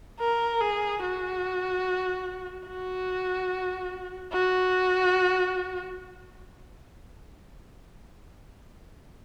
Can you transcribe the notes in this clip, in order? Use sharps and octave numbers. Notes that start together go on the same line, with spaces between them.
A#4
G#4
F#4
F#4
F#4